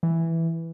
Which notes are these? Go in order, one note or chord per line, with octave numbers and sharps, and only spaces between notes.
E3